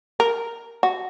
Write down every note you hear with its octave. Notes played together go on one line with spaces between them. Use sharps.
A#4
F#4